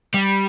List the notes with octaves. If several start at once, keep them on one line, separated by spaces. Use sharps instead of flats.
G3